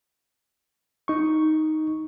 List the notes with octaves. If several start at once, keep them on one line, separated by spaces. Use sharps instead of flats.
D#4 C#6